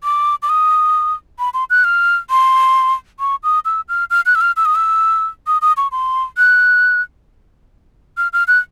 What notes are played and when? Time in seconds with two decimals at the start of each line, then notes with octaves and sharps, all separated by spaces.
0.04 D6
0.43 D6
0.49 D#6
1.39 B5
1.54 C6
1.70 F#6
1.84 F6
2.30 C6
3.20 C#6
3.43 D#6
3.65 E6
3.89 F6
4.10 F6
4.26 F#6
4.35 E6
4.41 F6
4.57 E6
4.65 D#6
4.75 E6
5.47 D#6
5.62 D#6
5.77 C#6
5.92 C6
6.38 F#6
8.17 F6
8.33 F6
8.48 F#6